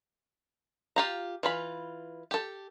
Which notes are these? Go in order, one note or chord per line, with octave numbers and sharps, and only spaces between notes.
F4 G4 A#5
E3 F4 B5
G4 A4